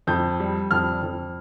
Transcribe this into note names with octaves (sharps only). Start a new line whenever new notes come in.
F2 G6
G3
F2 F6
F2